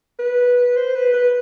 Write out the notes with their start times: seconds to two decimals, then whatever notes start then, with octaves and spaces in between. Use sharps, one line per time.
0.19 B4
0.76 C5
0.95 B4
1.14 B4